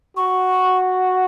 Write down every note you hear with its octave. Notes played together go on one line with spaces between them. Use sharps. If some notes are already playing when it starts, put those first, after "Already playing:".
F#4 C#6